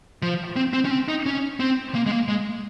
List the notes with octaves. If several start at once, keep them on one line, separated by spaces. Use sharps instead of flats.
F3
C4
C4
C#4
C4
D#4
C#4
C4
A#3
G#3
A#3
G#3